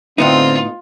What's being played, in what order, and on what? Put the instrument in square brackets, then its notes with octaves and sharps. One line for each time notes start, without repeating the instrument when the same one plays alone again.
[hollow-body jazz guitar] A2 B3 D#4 [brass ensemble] D3 C4 [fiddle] F4